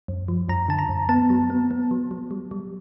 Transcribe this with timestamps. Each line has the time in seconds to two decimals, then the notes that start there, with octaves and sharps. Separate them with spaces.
0.08 F#2
0.28 F3
0.49 F#2 A#5
0.68 D3 A5
0.79 A#5
0.89 F#2
1.09 B3 A5
1.30 F#3
1.50 B3
1.71 B3
1.91 F#3
2.11 F#3
2.31 G3
2.51 G3